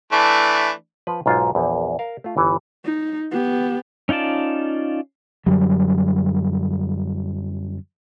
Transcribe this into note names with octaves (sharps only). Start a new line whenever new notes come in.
E3 A3 D4
F3 B4
B1 G#2 F4
A#1 E2
A#4 F5
A3 F4
G1 E3
D#4
B3 G4
C#4 D#4 F4 D5 A5
F#2 D3 F#3 G3